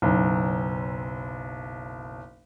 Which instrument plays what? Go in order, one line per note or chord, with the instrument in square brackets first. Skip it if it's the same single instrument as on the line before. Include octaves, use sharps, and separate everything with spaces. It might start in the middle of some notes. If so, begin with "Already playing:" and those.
[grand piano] F#1 B1